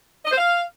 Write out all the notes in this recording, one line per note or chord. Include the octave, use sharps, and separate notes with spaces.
D#5
C5
F5